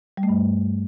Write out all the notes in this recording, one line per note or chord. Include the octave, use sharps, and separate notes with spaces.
G3
A3
G2